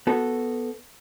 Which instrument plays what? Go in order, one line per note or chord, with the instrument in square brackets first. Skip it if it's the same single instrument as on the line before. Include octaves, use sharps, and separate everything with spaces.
[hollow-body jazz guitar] B3 F#4 A4